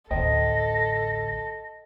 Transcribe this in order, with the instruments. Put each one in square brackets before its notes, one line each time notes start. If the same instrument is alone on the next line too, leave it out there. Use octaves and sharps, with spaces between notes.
[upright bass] A1 D2 [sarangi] A4 [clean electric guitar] C5 D#5 G5 [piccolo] A#6